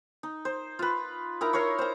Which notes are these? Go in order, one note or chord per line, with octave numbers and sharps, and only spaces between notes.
D#4
C5
F4 B4
D#4 E4 A#4 A#5
A#4 C#5 C6 C#6
C5 A#5